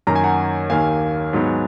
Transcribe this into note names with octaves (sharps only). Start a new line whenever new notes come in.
F#2 D#3 A#3 A#5
G#5
F#5 A#5
D#2 D#3 A#3 F5 G#5
G#2 F#3 B3